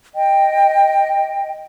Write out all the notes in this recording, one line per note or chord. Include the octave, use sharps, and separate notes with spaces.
D#5 G5